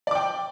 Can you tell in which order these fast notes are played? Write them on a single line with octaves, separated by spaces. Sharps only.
D5 D6 G5